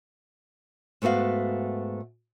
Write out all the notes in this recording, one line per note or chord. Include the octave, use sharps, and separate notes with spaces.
G#2 A3 B3 F#4 F5